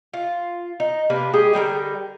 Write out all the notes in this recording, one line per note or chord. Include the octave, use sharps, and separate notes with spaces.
F4
D#4
C3 A#3 D4 B4
G#3 G4 G#4
D3 G3 A#4 G5